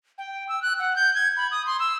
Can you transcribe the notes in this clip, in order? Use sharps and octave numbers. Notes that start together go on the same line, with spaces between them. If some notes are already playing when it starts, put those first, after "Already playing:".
G5
E6
F#6
F#5
G6
G#6
B5
D#6
C6
E6